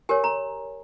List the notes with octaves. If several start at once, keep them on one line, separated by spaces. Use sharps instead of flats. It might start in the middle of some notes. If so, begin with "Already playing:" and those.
G4 A#4 C#5 G#5
A#5